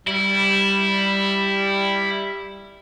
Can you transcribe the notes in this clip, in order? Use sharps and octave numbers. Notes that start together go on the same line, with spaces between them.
G3 E4